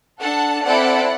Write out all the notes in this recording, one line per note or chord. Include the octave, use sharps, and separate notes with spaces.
D4 A4 F#5 A5
C4 E4 A4 D5 F#5